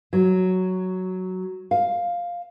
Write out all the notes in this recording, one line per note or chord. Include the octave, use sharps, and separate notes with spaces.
F#3
F5